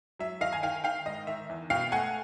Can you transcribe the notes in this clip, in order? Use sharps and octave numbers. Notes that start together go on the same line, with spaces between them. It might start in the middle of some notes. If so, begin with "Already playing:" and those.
F#3 E5
D#3 D#5 F5
G#5
D#3 F5 G5
D#3 F5 G5
G#2 D#5
D#3 E5
E2
B2 F5 G5
A3 F#5 G#5